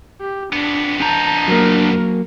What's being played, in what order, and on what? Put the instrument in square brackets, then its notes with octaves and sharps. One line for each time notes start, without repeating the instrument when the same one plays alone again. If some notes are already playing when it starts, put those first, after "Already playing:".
[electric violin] G4
[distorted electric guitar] F2 B3 [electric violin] D4
[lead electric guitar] D4 A#5 [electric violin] A5 G6
[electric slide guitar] F#3 A#3 [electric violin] A#4